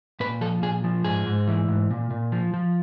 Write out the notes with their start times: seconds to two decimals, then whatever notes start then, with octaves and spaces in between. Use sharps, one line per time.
0.20 A#2 B4
0.41 F3 A4
0.62 A#2 G#4
0.84 F3
1.05 G#2 G#4
1.26 G#2
1.47 E3
1.68 G#2
1.90 A#2
2.11 A#2
2.32 F3
2.54 F3